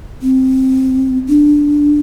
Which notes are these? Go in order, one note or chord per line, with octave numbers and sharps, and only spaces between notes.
C4
D4